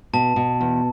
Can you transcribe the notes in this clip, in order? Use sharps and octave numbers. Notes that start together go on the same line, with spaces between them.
B2 A5
B2
E2